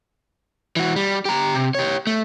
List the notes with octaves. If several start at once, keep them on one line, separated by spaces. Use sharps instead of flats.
E3 F#4
G3
G4 A#5
C3
G4 C#5
A3